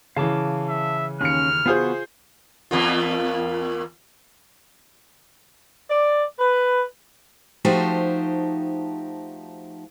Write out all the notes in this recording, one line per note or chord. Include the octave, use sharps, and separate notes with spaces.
C#3 E3 F5 A5 D6
E5
D#2 C#4 F6 C#7
B3 F4 F#4 G#4 C5
E2 A#3 F4
D5
B4
F3 A3 D#4 F#4 G4 C5